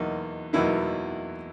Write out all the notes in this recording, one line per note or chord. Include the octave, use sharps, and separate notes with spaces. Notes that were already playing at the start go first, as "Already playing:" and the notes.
Already playing: E2 B2 F#3 A#3 D#4
E2 B2 F#3 A#3 D#4 E4